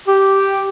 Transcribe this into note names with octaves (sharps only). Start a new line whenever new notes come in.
G4